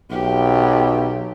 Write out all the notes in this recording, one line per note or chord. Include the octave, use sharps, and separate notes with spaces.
B1 G4